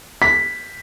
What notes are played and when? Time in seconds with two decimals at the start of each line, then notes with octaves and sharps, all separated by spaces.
0.22 B6